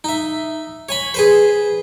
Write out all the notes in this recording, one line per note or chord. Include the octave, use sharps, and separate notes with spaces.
D#4 E5
C#5 G#5 B5
G#4 B4 C5